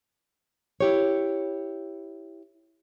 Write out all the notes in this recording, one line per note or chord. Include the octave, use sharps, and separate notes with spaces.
E4 G4 C#5